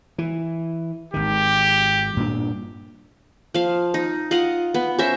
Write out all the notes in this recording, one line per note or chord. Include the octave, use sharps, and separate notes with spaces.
E3
G#1 D#3 G4
G2 A#2 D4
F3 F5
D#4
F4 D#5 F5 F#5
B3
C#4 A#4 C5 E5